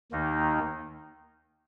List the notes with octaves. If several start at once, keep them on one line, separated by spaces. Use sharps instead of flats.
D#2 D#3 A#3 D#4